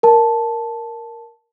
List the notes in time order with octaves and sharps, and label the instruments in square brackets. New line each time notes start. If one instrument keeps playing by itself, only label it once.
[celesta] A#4 A5